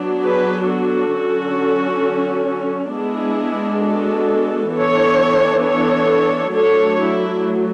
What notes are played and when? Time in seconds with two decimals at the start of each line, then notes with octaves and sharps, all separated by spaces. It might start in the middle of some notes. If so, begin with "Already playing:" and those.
Already playing: F#3 B3 D4
0.23 G#4 B4
0.68 F#4 A4
1.15 D3 F#3 C#4
2.94 G#3 B3 D4 E4 G#4
3.84 F#4 A4
4.75 E3 B3 D4 A4 C#5
5.64 A4 C#5
6.54 F#3 A3 D4 A4 C#5
7.00 E4